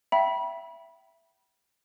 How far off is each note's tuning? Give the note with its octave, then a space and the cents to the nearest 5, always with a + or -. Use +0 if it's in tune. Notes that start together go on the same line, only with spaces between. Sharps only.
E5 +15 G5 -35 B5 -30